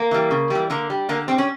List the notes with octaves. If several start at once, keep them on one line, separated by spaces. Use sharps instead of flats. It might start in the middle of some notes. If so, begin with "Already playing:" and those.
Already playing: A#3
E3 G3
C#3
E3 G3
D3 A#3
G3
D3 A#3
G3 C4
C#4